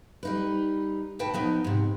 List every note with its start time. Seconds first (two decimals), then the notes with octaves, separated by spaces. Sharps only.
0.23 G3 D#4 B4
1.19 D2 F#4 B4 G5 A5
1.34 F3 B3 D#4
1.64 G#2 C3